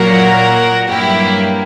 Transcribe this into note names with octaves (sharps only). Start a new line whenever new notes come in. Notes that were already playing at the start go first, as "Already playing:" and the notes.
Already playing: A#2 F#3 A#3 F#4 A#4
G2 F#3 A#3 E4 G4